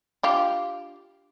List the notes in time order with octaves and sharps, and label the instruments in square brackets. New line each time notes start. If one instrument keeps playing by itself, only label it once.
[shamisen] D4 F4 G4